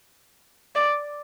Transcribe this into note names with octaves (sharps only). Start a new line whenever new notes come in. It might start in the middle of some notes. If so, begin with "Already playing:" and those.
D5